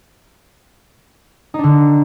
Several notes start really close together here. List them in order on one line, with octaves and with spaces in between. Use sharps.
D#4 D4 D3